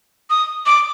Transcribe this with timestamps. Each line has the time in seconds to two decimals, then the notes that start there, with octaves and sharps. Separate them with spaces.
0.30 D#6
0.66 D6